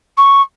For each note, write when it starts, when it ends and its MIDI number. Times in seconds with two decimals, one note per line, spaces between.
0.17 0.41 85